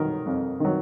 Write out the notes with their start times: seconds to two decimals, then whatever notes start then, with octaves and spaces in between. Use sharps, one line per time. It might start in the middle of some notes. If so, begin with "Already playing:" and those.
Already playing: D#3 F#3 A#4
0.26 F2
0.60 D#3 F#3